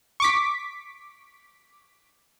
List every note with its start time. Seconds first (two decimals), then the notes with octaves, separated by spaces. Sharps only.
0.20 C#6 D6 B6